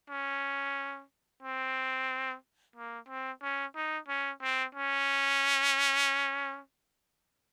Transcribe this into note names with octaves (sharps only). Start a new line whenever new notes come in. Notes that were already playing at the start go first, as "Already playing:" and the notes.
C#4
C4
A#3
C4
C#4
D#4
C#4
C4
C#4